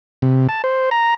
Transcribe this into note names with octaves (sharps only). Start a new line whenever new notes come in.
C3
A5
C5
A#5